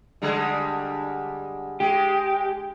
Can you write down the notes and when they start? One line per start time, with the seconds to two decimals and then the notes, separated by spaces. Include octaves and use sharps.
0.22 D3 G3 G#3
1.80 G#3 G4